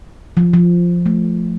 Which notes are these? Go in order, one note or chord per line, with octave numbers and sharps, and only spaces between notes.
F3
F3
A3